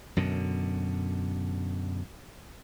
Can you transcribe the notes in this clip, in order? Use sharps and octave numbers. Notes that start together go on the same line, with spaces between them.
F#2 B2 D3